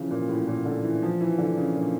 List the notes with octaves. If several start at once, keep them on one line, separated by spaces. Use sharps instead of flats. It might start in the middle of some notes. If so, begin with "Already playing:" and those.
Already playing: C#3 E3 F3
A#2
A2
A#2
D3
E3
F3
E3
D3
C#3
A#2